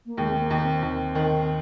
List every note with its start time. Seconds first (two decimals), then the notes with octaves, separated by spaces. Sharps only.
0.06 A#3
0.18 D#2 G#3
0.30 C4
0.39 A#3
0.50 D#2
0.61 C4
0.82 D#2
1.15 D#3